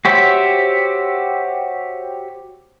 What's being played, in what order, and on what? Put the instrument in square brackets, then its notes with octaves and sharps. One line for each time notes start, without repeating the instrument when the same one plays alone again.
[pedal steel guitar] F#4 G4 C5 C#5 E5